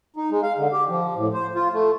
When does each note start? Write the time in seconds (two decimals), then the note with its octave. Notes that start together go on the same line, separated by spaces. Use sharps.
0.16 D#4
0.31 G#3
0.42 F5
0.58 D3
0.72 G4
0.89 F3
1.16 A2
1.33 C5
1.55 F4
1.73 A3